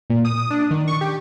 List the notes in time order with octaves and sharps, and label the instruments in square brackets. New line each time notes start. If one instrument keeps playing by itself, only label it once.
[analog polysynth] A#2
D#6
D4
D#3
C#6
G4